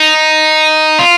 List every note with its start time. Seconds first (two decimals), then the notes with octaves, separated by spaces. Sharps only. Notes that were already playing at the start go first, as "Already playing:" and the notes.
Already playing: D#4
0.99 F4